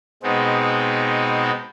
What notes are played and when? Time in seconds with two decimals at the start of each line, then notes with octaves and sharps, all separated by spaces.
0.23 B2 G#3 B3 C4 D#4